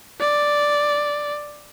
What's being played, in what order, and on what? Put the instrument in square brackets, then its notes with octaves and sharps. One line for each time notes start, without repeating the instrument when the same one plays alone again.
[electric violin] D5